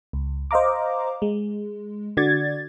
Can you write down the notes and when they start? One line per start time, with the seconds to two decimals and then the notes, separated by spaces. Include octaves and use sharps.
0.13 C#2
0.51 C5 D#5 F5 A#5 D6
1.22 G#3
2.17 D3 F#4 D5 G#6 A6